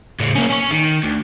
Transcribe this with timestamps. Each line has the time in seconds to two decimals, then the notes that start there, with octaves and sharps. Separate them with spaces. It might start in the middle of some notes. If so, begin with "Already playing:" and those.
0.20 A2 C#3
0.35 A#3 C#4
0.50 C#4 C#5
0.71 D#3
1.03 D2